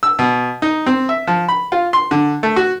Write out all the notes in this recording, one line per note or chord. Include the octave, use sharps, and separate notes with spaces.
E6
B2
D#4
C4
E5
F3
B5
F4
C6
D3
A3
F#4